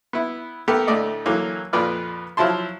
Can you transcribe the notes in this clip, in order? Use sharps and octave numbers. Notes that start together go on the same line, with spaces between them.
B3 E4
A3 B3 G4 A4 A#4
D2 A2 A3 D5 D#5
D3 E3 F#3 A#3 D6
F2 A#2 F4 B4 D5 F6
F3 F#3 E4 A5 C6